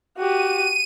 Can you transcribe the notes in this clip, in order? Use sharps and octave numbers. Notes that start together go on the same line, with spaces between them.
F#4 G4 D#7